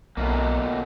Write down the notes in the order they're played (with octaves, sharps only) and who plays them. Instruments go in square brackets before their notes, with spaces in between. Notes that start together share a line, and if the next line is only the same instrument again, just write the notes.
[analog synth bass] B1 [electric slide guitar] B2 A3 A#3